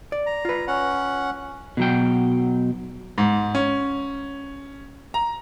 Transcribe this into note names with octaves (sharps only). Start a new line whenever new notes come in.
D5
A#5
F4 B4
C#4 F#5
B2 F#3 G5
G#2
C#4
A#5